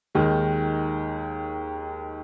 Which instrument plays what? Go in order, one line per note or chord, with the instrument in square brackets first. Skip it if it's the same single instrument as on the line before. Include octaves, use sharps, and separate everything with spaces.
[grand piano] D#2 D#3 G#3